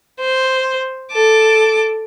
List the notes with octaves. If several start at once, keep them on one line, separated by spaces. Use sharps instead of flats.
C5
A4 D6